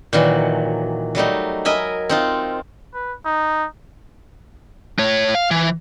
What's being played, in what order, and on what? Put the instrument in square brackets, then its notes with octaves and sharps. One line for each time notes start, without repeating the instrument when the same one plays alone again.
[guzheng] A#2 D#3 E3 F#3
F#3 G3 A3 D#4
A#4 D#5 E5 G#5 B5
C4 D#4 F4
[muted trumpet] B4
D#4
[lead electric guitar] A3 C#5
F5
E3